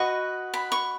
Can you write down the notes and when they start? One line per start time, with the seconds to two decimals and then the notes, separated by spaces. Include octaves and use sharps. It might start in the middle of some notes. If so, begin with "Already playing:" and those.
Already playing: F#4 B4 D#5 C#6
0.54 B5
0.72 C#6